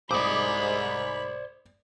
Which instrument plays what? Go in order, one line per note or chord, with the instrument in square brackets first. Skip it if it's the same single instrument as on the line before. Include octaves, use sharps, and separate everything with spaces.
[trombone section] G#2 [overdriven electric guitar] C5 D5 [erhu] B5 [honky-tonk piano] D6 D#6